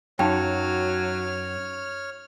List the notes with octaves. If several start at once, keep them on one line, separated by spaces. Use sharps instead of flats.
F#2 F#3 D#4 C#5 F5 G5 F6